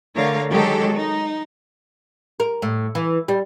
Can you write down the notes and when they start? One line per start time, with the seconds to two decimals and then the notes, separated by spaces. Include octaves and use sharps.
0.15 D3 A3 A#4 C#5 F5
0.49 D#3 F#3 G#3 G4 A4
0.94 D#4
2.40 A#4
2.62 A2
2.95 E3
3.28 G3